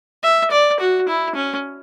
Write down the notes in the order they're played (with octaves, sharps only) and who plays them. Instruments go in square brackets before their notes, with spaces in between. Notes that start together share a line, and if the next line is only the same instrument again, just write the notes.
[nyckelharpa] E5
D5
F#4
E4
C#4